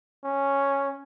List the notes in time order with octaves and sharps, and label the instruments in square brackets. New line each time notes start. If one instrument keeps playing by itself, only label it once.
[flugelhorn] C#4